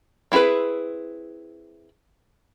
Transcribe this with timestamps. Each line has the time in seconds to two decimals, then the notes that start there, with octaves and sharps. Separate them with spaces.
0.32 C4 E4 F#4 G#4 B4